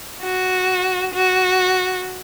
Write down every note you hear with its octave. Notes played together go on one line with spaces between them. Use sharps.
F#4
F#4